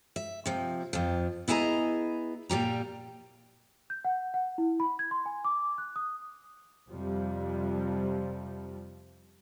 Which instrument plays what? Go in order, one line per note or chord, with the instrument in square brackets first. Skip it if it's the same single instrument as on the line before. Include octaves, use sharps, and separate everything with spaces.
[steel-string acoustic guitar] E5
C3 F3
F2 F3
B3 E4 G#4 D#5 A#5
A#2 G3 G4 A#5
[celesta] G6
F#5
F#5
E4
B5
G#6
C6
G#5
D6
F#6
D#6
[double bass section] F2 C3 F3 G3